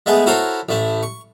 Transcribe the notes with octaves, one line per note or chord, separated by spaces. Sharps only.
G#3 A3 B3 G#4
E4 F#4 A4 A#4 C5 C#5
A1 A3 E4
C#6